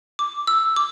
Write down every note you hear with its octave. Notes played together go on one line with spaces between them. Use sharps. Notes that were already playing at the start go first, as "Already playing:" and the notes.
D6
E6
D6